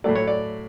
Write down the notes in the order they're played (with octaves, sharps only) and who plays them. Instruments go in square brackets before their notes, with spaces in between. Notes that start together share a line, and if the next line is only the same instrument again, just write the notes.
[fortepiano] A2 F#3 A3 D5
C#5
D5